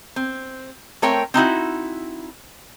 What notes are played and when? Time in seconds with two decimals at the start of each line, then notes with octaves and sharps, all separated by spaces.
0.16 C4
1.02 A3 C4 A#4 C#5 G5
1.34 C4 D#4 E4 F#4